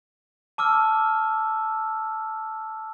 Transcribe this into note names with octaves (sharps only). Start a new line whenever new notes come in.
A5 D6 E6 F6